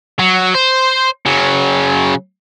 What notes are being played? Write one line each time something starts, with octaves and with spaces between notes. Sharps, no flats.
F#3
C5
C#3 F#3